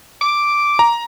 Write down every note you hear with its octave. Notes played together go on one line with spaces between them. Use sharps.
D6
A#5